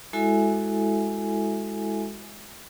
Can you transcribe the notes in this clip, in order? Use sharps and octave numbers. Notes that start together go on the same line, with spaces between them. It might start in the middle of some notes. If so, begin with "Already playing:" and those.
G#3 E4 F#4 A4 E5 G#5